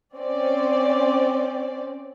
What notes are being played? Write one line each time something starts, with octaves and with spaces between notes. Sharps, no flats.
C4 C#4 D5